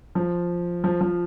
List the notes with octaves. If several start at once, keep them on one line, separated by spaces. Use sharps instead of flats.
F3
F3
F3